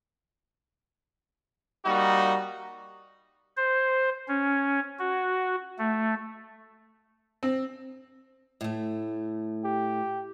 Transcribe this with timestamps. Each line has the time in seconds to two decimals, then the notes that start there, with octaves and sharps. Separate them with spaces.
1.86 G3 A#3 D#4 F#4
3.57 C5
4.28 C#4
4.99 F#4
5.79 A3
7.43 C4
8.61 A2 A3
9.65 G4